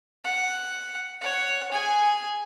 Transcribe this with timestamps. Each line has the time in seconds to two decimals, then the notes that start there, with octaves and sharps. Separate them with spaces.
0.24 F#5
1.21 C#5 F#5
1.71 G#4 G#5